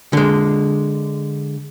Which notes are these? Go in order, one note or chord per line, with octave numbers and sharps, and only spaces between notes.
D3 G#3